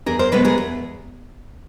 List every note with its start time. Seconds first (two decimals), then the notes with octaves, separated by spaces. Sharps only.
0.06 E2 G#4 A#4
0.19 A#4 C5
0.32 B2 G#3 B3 A4 B4
0.45 G#4 A#4
0.58 E2